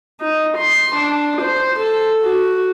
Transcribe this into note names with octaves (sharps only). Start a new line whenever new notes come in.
D#4
C6
D4
C5
A4
F#4